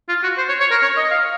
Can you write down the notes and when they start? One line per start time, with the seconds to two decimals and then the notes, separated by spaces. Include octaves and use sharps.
0.08 F4
0.23 F#4
0.38 C5
0.49 C#5
0.60 C#5
0.71 A#4
0.82 C#5
0.97 D#5
1.11 F5